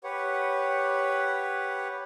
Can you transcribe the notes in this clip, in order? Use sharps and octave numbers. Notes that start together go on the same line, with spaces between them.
G4 B4 C#5 F#5